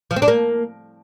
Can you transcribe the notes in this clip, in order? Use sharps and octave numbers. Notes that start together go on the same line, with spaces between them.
F3
C4
D4
A#3